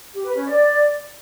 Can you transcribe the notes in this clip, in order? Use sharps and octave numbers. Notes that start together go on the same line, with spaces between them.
G4
B4
C#4
D5